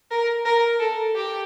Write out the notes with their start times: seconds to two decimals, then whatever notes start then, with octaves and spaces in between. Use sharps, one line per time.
0.11 A#4
0.45 A#4
0.80 A4
1.15 G4